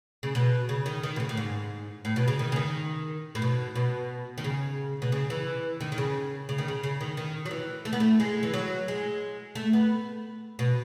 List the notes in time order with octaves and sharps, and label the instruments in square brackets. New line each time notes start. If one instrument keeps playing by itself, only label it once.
[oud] C#3
B2
C#3
D#3
D#3
B2
C#3
A2
G#2
A2
B2
C#3
D#3
C#3
D#3
A2
B2
B2
D#3
C#3
B2
C#3
E3
D#3
D#3
C#3
C#3
D#3
C#3
C#3
D#3
D#3
F#3
E3
A3
B3
A3
G#3
E3
F#3
G#3
A3
B3
B2